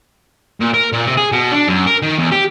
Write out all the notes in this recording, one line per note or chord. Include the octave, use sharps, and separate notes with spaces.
A#2
A#4
A#2
C3
G#4
B2
D4
F#2
A#4
D#3
E2
G4